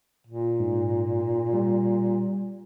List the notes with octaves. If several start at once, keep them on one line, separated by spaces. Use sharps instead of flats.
A#2
G#2
G3